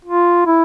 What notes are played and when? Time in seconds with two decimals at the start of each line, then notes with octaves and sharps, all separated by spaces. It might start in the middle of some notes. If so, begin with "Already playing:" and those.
0.05 F4
0.46 E4